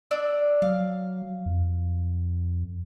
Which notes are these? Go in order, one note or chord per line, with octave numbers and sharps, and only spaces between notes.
D4 D5 E6
F#3 F5
F2